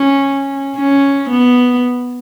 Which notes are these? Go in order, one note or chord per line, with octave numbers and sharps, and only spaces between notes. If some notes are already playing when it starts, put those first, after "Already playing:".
Already playing: C#4
C#4
B3